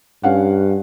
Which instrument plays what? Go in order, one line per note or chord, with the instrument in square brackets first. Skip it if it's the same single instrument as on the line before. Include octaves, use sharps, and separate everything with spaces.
[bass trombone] G2 [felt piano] C#4 F5 F#5